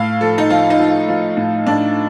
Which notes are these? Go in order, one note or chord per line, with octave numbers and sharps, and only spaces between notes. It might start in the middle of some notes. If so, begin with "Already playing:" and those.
Already playing: A2 F5
F3 A4
D#4
F3 F4
D#4
F3
F4
F3
A2
A2 D4